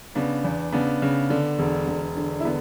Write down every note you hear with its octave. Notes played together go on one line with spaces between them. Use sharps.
C#3 B3 D4
E2
C#3 B3 D4
C#3
D3
E1
E1
D3
E4
D3 B3